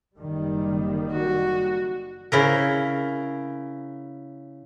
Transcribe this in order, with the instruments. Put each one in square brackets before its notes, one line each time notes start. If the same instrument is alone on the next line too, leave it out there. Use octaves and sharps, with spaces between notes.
[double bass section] F#1 D#3 G3
[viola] F#4
[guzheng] C#3 E4 A#4